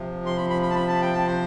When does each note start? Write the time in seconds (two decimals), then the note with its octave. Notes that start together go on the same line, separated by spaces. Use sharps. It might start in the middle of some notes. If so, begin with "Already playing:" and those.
Already playing: C3 F3
0.26 C6
0.37 B5
0.50 B5
0.62 B5
0.70 A5
0.75 B5
0.88 A5
1.01 G5
1.13 A5
1.26 C5